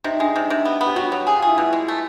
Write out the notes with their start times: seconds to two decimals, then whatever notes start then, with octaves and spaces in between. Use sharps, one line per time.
0.04 C3 D#4
0.15 D4
0.20 G#3 D#4
0.35 C3 D4
0.50 C3
0.65 B3
0.81 B3
0.86 G4
0.96 F#3 F#4
1.12 F#3
1.27 G4 G#4
1.36 F4
1.42 E4 G#4
1.57 B2 E4
1.73 G#3
1.88 A3